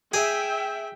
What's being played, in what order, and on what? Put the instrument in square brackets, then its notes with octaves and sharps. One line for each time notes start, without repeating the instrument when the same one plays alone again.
[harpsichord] G#4 [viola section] E5 G5